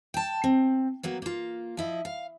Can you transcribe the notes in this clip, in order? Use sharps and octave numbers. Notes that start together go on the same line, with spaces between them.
G5 A5
C4
F#3 A#3 B3
A#3 F4
F3 E4 D#5
F5